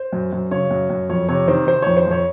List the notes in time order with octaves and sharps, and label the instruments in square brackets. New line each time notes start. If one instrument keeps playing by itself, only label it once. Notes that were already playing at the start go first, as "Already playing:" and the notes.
Already playing: [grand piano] C5
F#2
F#2
C#3 C#5
F#2
F#2
F2 C#5
C3 C#5
D#3 C5
D#3 C5
F2 C#5
C5
F2 C#5